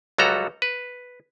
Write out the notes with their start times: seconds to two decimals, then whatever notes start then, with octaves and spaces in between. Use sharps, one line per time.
0.18 C#2 F#3 G3 F#4 A4 A#5
0.62 B4